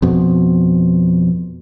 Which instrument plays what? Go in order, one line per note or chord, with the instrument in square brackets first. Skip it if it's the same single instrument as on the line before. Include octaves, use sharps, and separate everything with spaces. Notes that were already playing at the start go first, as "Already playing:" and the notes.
[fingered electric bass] F2 B2